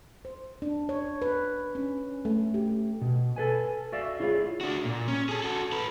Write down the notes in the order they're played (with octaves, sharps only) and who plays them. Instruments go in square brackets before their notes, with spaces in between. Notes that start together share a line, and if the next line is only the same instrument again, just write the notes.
[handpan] C5
D4
C#5
B4
C#4
A3
G4
[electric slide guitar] B2
A4 B4 G#5
F#4 D5 E5 F5
E4 F4 G#4 C#5 F5
[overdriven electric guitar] D4 F#4
A#2
C#4
G#4 A4
F#4 A4
A4 B4